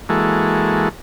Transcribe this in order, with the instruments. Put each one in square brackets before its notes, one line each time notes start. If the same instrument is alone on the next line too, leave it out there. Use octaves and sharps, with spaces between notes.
[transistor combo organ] E3 G#3 A#3 F#4 A4